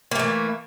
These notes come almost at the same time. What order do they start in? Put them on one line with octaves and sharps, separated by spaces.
A#3 A3 E3